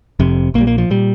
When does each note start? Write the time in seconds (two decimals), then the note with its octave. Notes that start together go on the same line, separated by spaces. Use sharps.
0.20 F1 F2 C3
0.54 A#1 A#3
0.58 A#2 G3
0.67 A#3
0.78 F3
0.90 A#2 G3